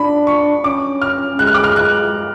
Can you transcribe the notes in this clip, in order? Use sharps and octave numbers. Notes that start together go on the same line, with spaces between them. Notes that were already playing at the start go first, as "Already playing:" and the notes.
Already playing: D4 B5
C#6
C#4 D6
F6
G#3 F#6
F6
D6
F6
F#6